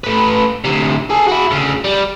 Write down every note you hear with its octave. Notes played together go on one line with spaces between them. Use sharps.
A3 B4
D2 C3
G#4 A4
E4 F#4
D2 C#3
G3